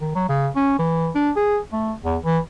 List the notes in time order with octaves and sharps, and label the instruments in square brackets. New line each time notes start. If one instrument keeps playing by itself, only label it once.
[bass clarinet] D#3
F#3
C#3
C#4
E3
D4
G#4
A3
E2
E3